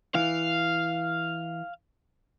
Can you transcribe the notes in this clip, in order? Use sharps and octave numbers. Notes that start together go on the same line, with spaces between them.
E3 F5